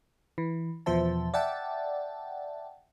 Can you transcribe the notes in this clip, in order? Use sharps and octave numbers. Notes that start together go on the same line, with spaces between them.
E3
E2 B2 F3 C5 E5 A5
D5 E5 F#5 G5 A5